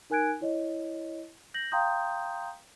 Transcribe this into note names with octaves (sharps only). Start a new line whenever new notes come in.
D#4 A#4 G#5 F#6 G#6 D7
E4 C#5 D#5
G6 A#6 F#7
F5 G5 A#5 C6 D#6 G6